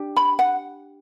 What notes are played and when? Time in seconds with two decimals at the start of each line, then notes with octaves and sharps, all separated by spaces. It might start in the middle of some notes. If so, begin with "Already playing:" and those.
Already playing: D4 G4
0.16 B5
0.39 F#5